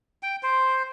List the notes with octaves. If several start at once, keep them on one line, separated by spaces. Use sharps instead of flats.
G5
C5